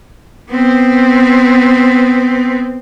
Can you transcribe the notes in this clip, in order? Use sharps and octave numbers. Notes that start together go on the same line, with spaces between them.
B3 C4